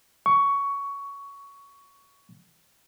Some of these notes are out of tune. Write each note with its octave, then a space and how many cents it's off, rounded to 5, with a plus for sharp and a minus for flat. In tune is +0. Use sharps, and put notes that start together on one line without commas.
C#6 +15